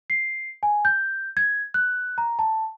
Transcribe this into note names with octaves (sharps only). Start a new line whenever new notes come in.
C7
G#5
G6
G#6
F#6
A#5
A5